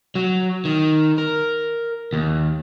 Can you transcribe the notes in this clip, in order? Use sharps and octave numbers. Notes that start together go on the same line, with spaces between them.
F#3
D#3
A#4
D#2